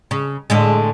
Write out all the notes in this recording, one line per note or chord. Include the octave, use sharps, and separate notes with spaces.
C#3
A2 D3 G#3